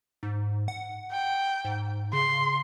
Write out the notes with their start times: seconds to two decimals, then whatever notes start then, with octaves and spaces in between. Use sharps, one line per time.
0.23 G#2
0.68 F#5
1.12 G5
1.65 G#2
2.13 C#3 C6